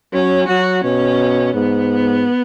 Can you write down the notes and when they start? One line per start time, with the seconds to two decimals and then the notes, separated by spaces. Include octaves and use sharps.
0.13 F#3 C#4
0.48 F#3 F#4
0.84 B2 C#4
1.54 G#2 B3